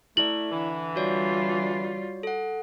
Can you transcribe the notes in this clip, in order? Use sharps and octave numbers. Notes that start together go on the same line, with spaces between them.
A3 E4 D5 F#7
D3 E3
G3 F4 F#4 C#5 D5
A4 F#5